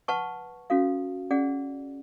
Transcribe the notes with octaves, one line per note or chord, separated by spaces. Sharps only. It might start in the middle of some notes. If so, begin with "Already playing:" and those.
B4 F#5 A5 C#6
C#4 F#4 A4 F5
C#4 G#4 D5 F#5